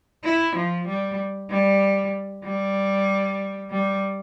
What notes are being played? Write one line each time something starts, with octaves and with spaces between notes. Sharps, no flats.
E4
F3
G3
G3
G3
G3